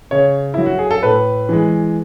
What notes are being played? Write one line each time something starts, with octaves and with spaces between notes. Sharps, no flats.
C#3 C#5
F#3 E4
F#4
G#4
A4
A2 B4
E3 G#3